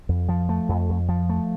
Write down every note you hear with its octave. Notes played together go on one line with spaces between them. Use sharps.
F2
F3
A3
F2
F2
F3
A3